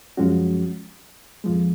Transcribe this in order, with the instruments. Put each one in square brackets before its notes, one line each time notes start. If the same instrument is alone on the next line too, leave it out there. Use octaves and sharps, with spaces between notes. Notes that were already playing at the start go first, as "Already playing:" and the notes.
[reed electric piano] F#2 F3 G#3 C#4 F#4
F2 F3 G#3